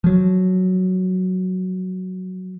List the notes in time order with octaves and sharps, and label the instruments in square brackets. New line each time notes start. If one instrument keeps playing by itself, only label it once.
[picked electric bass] F3 F#3